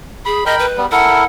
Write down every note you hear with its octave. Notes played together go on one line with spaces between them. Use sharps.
G#4 B5
A#4 D#5 G5 B5
B4
G3 B3
E4 A4 A#4 F#5